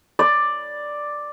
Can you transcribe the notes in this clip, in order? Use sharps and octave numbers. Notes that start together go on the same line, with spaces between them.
D5